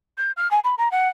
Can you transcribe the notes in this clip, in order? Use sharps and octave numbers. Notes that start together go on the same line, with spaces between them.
G6
F6
G#5
B5
A#5
F#5